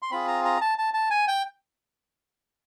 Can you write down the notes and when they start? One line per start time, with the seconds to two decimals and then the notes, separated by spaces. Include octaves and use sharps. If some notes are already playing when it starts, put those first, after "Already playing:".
0.02 C6
0.11 C4 F4 G#4 B5
0.28 A#5
0.45 A#5
0.61 A5
0.78 A5
0.94 A5
1.10 G#5
1.28 G5